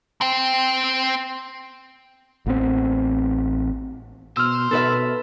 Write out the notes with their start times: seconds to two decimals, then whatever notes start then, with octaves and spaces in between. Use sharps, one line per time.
0.21 C4 G5
2.46 A1 B3 C4
4.37 B2 C5 E6 F6
4.71 B2 A4 B4 E5